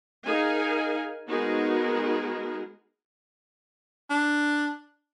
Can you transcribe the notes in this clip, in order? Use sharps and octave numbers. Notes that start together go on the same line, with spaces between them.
D#4 G#4 A#4 F5 G#5
G#3 B3 D#4 F#4 G#4 A#4
D4